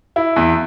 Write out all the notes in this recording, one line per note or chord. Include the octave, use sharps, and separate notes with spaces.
E4
E2